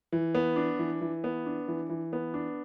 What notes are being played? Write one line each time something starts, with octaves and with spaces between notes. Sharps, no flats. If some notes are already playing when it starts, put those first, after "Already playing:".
E3
B3
D4
E3
E3
B3
D4
E3
E3
B3
D4